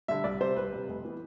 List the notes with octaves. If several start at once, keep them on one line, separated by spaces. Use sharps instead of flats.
D3 G3 E5
C2 D5
C3 G3 C5
C2 B4
C3 G3
F1
E3 B3